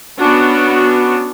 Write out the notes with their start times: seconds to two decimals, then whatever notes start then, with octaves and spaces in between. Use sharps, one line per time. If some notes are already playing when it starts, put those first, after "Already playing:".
0.17 B3 C#4 D4 F#4